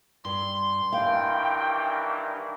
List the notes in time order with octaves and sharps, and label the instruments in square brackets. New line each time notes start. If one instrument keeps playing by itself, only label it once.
[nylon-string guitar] G2 [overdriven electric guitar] C6
[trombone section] G2 D#3 E3 [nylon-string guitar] F5 [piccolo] G5